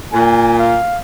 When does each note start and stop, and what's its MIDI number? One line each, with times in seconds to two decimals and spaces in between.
0.12 0.76 46
0.12 0.57 80
0.58 0.99 77